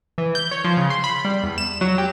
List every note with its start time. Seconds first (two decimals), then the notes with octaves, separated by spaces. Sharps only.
0.18 E3
0.35 G6
0.51 C#5
0.64 F3
0.77 C#3
0.90 C6
1.04 B5
1.25 G3
1.43 E2
1.58 E7
1.81 F#3
1.98 G4